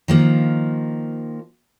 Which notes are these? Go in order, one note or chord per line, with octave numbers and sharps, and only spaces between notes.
D#3 F3 A#3